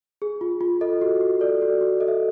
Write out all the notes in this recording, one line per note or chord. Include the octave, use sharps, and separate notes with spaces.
G#4
F4
F4
A4 D#5
F#4
F#4
A4 D5
F#4
F#4
A4 D#5
E5